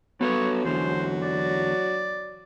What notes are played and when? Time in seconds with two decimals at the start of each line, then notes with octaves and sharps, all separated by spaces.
0.21 F#3 B3 A4 B4 C#5
0.65 E2 D3 C5
1.22 D5